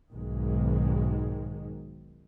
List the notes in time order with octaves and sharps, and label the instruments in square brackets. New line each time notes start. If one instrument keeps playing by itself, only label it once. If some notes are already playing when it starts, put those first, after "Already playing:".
[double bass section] B1 G#2 D#3 G#3